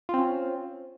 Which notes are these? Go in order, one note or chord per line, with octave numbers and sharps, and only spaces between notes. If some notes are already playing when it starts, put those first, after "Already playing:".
C4 C#4 F4